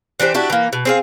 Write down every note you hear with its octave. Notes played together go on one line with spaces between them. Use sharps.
E3 D4 G4 C5
D4 E4 F#4 G4
E3 A#3
B2
C4 G#4 F5